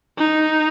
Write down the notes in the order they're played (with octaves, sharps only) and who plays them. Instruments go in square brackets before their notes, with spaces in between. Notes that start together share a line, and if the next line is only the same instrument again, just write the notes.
[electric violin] D#4